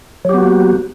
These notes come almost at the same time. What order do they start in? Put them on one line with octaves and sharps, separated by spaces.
F#3 G4 B3 F#4 A#3